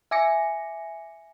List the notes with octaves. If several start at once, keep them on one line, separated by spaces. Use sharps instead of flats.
E5 G#5 D6 A#6 C#7